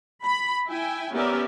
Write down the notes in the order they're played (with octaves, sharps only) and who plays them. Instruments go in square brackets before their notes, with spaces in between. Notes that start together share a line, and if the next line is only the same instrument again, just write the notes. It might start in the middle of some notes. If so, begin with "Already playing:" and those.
[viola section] B5
E4 G5 G#5
B3 C#4 G4 A#4 D5 E5